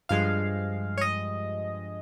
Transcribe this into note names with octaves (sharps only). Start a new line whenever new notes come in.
G2 F3 G#3 F5
C#5
D#5